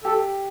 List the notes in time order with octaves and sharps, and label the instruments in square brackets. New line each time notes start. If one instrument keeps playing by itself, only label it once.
[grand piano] G4 [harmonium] A4